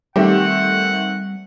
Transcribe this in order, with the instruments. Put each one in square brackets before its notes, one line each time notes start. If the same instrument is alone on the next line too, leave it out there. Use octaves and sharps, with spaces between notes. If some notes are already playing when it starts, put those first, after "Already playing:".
[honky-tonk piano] D#3 A3 C4 [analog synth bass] G3 [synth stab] G4 [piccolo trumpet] F#5